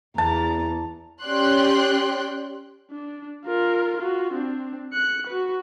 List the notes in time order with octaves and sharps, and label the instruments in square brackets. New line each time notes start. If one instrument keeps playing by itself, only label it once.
[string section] E2 [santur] A5 [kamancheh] A#5
[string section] C#4 G4 D5 G5 C6 F#6
[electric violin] D4
F4 A#4
F4 F#4
C4 D4
F#6 C#7
F#4 B4